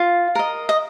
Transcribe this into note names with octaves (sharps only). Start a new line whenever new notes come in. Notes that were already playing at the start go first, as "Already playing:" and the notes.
Already playing: F4 F5
A#4 D#5
D#5